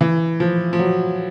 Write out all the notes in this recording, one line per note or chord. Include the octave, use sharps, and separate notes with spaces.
E3
F3
F3
F#3